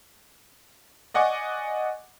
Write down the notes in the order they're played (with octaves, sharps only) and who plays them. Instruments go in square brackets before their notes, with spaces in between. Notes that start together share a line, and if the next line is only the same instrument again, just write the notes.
[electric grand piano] D5 D#5 F#5 G#5 C#6 D6